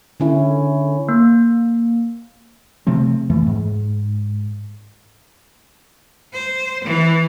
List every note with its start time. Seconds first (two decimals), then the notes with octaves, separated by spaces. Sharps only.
0.20 D3 C#4 E4
1.09 A#3
2.87 C3 F3 A3 C4
3.30 F2 E3 A3
3.47 G#2
6.33 C5
6.84 E3